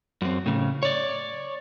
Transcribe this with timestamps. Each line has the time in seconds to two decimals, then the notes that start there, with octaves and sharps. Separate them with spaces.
0.22 F#2 C4
0.46 A2 C#3
0.83 C#5 D5